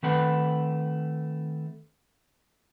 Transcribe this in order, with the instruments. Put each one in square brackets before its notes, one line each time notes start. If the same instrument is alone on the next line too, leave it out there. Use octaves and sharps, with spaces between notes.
[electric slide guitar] D#3 A3 C4 B4 F#5